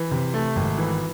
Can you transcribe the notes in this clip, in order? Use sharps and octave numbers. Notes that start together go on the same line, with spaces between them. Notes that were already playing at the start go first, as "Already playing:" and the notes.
Already playing: E3
C3
A3
G#1
E3